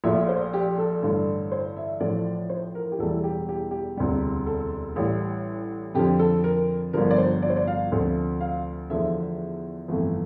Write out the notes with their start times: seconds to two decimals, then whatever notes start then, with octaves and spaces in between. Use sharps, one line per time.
0.04 A#1 A#2 A3 E5
0.29 C5
0.53 G4
0.78 A4
1.03 A1 G2 D3 A3
1.52 C5
1.77 E5
2.00 A1 A2 F3 A3 D5
2.49 C5
2.75 A#4
2.92 G4
2.99 E1 E2 E3 G3 A4
3.24 G4
3.49 G4
3.71 G4
3.97 E1 D2 C3 G3
4.46 A4
4.96 A1 A2 G3
5.94 F2 D3 F3 G4
6.19 A4
6.44 A#4
6.93 G1 G2 D3 F3 A#4
7.11 D5
7.18 C5
7.42 D5
7.50 C5
7.56 D5
7.67 F5
7.92 D2 C3 F3 A3
8.41 F5
8.90 E2 D3 F3 A3 E5
9.88 G1 F2 C3 E3 A3